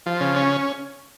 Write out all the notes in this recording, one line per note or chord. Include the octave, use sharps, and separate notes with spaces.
F3
C#3
C#4